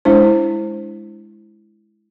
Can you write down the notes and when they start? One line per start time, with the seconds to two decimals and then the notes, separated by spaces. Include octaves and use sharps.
0.05 G#3 D4 E4 C5